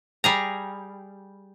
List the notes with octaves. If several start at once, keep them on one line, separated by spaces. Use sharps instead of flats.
G3 G#4 A#5